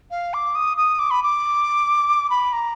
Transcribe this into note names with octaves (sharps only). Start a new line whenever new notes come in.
F5
D6
D#6
D#6
D6
B5
D6
B5
A#5